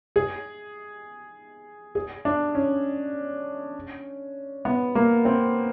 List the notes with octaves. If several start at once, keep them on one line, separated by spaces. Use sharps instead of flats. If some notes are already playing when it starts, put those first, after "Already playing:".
G#4
G#4
D4
C#4
B3
A#3
C4